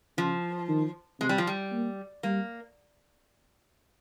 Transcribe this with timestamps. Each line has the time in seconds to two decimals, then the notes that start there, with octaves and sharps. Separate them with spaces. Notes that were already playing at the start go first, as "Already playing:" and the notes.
0.17 C#3 F3
0.69 D#3
1.20 C3 G#3
1.29 G3
1.38 F3
1.47 G3
1.72 A#3
2.23 G3 A#3